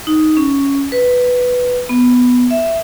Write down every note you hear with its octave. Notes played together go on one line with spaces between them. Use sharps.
D#4
C#4
B4
B3
E5